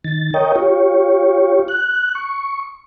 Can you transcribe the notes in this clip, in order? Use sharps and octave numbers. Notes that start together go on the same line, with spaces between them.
D#3 A6
A#4 C#5 D#5 G5
F4 G4 C#5
F#6
C#6